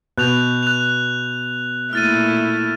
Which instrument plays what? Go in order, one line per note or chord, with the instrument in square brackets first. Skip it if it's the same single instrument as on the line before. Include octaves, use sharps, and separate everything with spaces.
[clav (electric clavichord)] B2 [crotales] F#6 G6 F7
[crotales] F#6 F7
[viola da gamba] A#2 A3 E4 [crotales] F6 A6 D#7